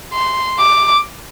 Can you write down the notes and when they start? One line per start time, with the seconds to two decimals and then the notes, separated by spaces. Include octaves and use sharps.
0.13 C6
0.59 D6